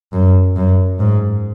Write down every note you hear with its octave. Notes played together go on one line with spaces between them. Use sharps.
F#2
F#2
G#2